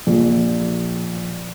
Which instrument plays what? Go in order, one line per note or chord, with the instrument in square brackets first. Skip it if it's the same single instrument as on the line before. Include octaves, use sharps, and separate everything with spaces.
[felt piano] A#1